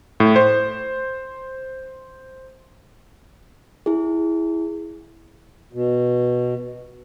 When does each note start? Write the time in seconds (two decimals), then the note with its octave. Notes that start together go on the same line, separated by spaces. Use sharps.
0.20 A2
0.36 C5
3.86 E4 G#4
5.73 B2